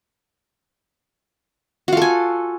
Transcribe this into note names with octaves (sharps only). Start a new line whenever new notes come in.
F4 F#4 A4 G#5